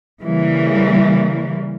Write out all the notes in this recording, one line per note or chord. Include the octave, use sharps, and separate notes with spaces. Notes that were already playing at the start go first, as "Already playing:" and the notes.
C#3 E3 G3 A#3